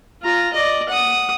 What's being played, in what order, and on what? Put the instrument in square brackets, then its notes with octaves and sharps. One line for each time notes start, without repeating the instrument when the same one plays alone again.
[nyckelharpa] F4 A#5
D5 D#5
F#5 D#6